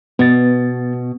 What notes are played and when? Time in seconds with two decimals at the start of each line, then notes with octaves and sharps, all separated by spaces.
0.19 B2 B3 A6